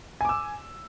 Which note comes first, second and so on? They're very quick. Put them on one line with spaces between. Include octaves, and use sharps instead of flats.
G#5 D6 E6